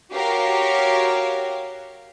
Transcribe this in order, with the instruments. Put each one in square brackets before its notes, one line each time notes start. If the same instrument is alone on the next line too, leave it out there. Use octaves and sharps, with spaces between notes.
[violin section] F#4 G4 A#4 C#5 F5